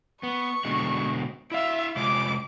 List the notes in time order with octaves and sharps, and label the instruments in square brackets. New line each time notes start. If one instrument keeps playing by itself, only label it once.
[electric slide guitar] B3 [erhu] C#6
[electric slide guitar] B2 D3 G#3
[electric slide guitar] E4 F5 [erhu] E5
[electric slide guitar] C3 G#3 F4 [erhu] D6